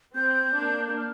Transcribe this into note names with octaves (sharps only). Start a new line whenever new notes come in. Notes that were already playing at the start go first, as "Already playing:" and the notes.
C4 G6
A#3 D4
G6
F6